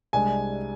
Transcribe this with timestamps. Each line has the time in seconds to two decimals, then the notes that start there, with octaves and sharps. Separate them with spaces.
0.13 C2 C3 G#3 D4 G#5